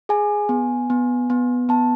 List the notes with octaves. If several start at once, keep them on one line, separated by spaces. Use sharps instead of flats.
G#4 G#5
B3
B3
B3
B3 A5